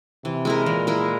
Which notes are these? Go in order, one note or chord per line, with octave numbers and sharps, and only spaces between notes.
C3 E3
G#3 E4 A#4
A#2 E3
G#3 E4 A#4